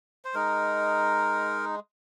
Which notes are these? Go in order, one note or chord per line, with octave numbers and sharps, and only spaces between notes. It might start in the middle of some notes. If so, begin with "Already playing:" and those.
C5
G#3 D#4 A#4